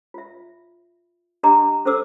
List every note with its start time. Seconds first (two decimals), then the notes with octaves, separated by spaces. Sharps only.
0.14 F4 E5
1.43 D4 G4 D#5 G#5 A#5 D6
1.85 C#4 A4 C5 D6 E6